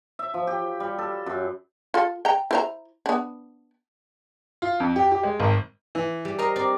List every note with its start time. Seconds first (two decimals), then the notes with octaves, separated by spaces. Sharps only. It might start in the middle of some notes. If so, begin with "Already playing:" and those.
0.19 E5
0.34 F3
0.47 G4
0.80 G3
0.99 A4
1.26 F#2
1.94 F4 A4
2.25 G5 A#5
2.51 E4 C5 A#5
3.06 B3 D4
4.62 F4
4.80 F2
4.96 G4
5.12 G4
5.23 G#3
5.40 G#1
5.95 E3
6.25 G3
6.39 A#4 C5 D#5 A#5
6.56 C4 D5